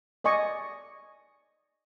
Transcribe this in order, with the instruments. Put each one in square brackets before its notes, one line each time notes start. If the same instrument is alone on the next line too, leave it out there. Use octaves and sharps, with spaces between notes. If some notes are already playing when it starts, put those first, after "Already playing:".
[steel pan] D5 D#5 G#5 C#6